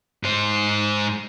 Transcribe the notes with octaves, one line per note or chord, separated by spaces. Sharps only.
G#2 C5